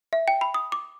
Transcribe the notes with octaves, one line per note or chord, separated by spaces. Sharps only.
E5
G5
B5
D#6
D6